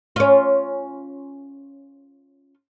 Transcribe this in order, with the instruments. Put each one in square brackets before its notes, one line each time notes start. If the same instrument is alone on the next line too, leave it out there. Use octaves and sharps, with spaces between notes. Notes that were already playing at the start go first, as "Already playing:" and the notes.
[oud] C#4 F4